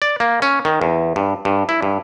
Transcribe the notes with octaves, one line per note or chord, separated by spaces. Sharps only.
D5
A#3
C#4
D#3
E2
G2
G2
E4
G2